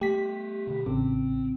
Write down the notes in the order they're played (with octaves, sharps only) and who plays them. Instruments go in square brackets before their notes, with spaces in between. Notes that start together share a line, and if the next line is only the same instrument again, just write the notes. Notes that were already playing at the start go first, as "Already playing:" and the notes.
[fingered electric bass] A3 B3 [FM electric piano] G4 B6
[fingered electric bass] B2 D3
[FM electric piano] A1 C#3 [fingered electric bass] C4